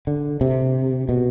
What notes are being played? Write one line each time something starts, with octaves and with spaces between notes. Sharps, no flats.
D3
C3
B2